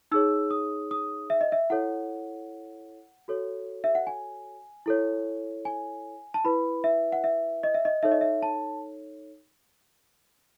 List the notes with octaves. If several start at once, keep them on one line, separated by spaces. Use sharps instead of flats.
D#4 G#4 C#5 E6
D#6
D#6
E5
D#5
E5
E4 A4 C#5 F#5
F#4 A4 C#5
E5
F#5
G#5
E4 A4 C#5
G#5
A5
E4 B4 B5
E5
F#5
E5
D#5
E5
D#5
D#4 A4 C#5 E5
D#5
E5
A5